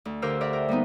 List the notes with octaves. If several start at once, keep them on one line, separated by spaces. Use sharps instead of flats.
D2
D3 G4 A#4 C5 F5 E6
A#4 D5 E5 F#5
A#4 G5
G3 A#3 B3 D#4